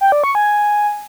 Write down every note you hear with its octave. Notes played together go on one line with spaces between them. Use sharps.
G5
D5
C#6
G#5